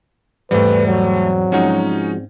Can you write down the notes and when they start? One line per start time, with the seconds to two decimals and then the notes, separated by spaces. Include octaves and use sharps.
0.51 E2 G#2 G3 A3 C4 B4 D5
0.86 F#3
1.52 F3 G#3 C#4 D#4 F#4